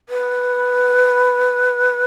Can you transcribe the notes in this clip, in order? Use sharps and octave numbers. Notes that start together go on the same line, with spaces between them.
B4